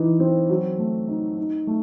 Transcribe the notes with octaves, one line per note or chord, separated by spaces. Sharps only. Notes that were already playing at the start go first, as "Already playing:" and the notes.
Already playing: E3 D#4
C4
F#3
A3
D#4
D#4
A3